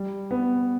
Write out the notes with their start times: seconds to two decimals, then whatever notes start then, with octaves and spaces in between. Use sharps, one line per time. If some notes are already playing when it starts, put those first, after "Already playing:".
Already playing: G3
0.31 B3